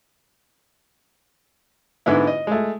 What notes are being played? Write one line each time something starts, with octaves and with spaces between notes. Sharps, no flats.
G#2 D3 B3 E4
D#5
G#3 A3